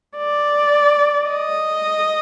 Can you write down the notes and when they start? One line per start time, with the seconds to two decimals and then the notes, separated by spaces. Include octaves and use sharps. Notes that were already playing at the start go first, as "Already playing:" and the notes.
0.17 D5
1.29 D#5